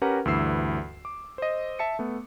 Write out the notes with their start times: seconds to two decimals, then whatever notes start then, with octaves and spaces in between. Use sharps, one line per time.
0.02 C#4 G4 A#4 B4 F#5 A#5
0.25 D2 G2 E3 E6 C7
1.05 D6
1.38 C5 D#5
1.79 E5 A5 C#7
1.99 A3 B3